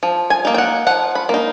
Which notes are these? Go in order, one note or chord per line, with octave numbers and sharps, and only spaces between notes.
F3
G#5
A#3 D#4
G5
F#5
F3 F#5
B5
A#3 D#4